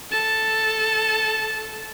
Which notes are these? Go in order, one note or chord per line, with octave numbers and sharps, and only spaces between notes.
A4 A5